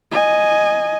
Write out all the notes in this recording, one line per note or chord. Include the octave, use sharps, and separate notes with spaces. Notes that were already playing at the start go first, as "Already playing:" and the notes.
D#5 G#5